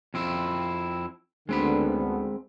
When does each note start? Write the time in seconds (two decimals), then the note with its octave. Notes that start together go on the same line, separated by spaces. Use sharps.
0.14 F2 C4 E4
1.49 D2 D3 G#3 B3 C4 B5